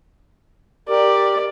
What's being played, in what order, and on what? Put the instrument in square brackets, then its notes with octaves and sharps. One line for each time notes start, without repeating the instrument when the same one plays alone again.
[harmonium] G4 A#4 [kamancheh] D5